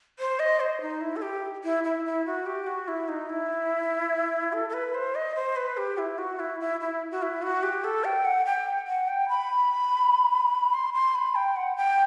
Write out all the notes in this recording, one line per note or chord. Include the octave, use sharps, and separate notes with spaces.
C5
D#5
C5
D#4
E4
A4
G4
E4
E4
E4
F#4
G4
F#4
E4
D#4
E4
A4
A4
B4
C5
D#5
C5
B4
G4
E4
F#4
E4
E4
E4
F#4
E4
F#4
G4
A4
G5
F#5
G5
F#5
G5
B5
C6
C6
B5
G5
F#5
G5